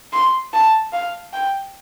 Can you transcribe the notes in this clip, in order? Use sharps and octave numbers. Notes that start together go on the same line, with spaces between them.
C6
A5
F5
G5